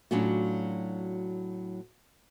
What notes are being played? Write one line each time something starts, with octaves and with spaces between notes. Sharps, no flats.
A2 F#3 C#4 D4 F4 F#4